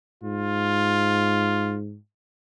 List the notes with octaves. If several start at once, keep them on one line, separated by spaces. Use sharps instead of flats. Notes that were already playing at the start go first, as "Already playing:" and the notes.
G#2 F4